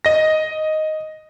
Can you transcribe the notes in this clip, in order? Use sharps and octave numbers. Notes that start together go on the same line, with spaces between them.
D#5 A#6